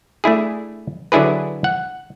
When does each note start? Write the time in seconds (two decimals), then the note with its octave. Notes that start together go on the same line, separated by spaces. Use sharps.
0.24 A3 D4 E4 G#4
1.12 D3 F#3 D4 E4 G#4 B4
1.64 F#5